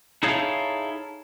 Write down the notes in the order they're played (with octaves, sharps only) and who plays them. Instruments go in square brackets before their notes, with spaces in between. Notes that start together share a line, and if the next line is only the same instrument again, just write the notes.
[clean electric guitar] D#4 E4 G#4 A4 C#5 F5